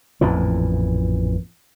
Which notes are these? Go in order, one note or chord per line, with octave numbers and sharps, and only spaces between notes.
A1 F2 A#2 E3